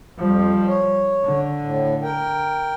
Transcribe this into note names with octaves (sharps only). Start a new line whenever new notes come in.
F2 F3 G3
C#5
D3
A2
A#4 G5